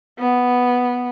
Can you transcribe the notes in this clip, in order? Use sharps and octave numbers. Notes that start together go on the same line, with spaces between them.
B3